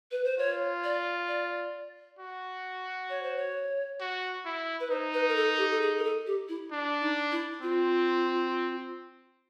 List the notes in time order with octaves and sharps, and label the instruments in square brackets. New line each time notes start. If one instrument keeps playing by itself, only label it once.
[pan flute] B4
C5
[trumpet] F4 [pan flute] C#5
[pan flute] D5
D5
[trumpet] F#4
[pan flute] C#5
C5
C#5
[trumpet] F#4
E4
[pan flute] B4
[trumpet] D#4 [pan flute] C5
[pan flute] B4
A#4
A4
G4
A4
G#4
A#4
A4
G4
E4
[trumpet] D4
[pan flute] D#4
E4
[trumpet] C4 [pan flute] F4